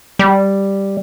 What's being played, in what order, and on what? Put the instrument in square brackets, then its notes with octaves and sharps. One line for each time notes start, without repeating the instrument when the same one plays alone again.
[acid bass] G3